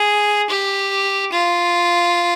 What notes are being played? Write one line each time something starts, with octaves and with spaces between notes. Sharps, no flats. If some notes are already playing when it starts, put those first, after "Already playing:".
Already playing: G#4
G4
F4